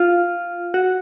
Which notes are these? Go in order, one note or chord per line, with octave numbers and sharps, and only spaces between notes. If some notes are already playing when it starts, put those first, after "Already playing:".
Already playing: F4
F#4